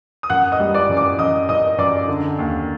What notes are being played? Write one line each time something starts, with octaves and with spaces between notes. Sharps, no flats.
D#6
F#2 F#5 F#6
D#5 D#6
G3
D5 D6
F#2
D5 D6
F#2 D#5 D#6
F#2 D#5 D#6
F#2 D5 D6
D3
D#2